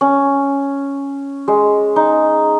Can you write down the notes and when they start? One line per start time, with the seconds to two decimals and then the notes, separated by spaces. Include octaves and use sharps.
0.01 C#4
1.48 G#3
1.96 D#4